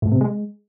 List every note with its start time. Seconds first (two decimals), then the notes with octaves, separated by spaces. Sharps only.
0.02 A2
0.12 C3
0.21 G#3